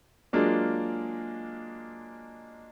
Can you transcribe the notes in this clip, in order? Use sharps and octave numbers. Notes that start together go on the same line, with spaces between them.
F#3 G#3 A#3 D4 F4